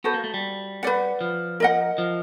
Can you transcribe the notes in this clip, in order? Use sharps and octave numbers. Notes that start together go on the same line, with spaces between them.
B3 F#4 A4 C5
A#3
A3
G3
B4 D5 F#5
F3
A#4 D#5 F#5
F3